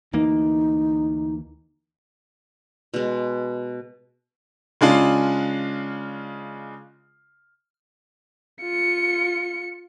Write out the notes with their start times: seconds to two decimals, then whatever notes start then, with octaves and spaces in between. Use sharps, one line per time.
0.13 D2 E3 A#3 D#4
2.94 B2 G#3
4.81 C#3 G#3 D4 F4
8.61 F4 C#7